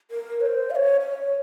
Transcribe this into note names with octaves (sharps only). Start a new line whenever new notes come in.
A#4
C#5
C5
F5
C#5
C#5